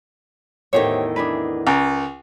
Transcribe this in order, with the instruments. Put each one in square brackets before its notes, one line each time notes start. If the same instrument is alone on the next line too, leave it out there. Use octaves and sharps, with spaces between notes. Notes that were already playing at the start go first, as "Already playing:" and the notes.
[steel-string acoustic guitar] E2 A2 D#3 [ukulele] G4 C5 C#5
[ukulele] D4 G#4 B4
[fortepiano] C#2 [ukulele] A#4